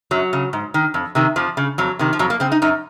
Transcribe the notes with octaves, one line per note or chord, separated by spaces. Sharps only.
F#2 F#3
C#3
G#2
D#3
F2
C3 D#3
F2 F3
C#3
F2 F#3
C3 D#3
F3
F2 F#3
A#3
C#3 C4
D#4
F#2 D#4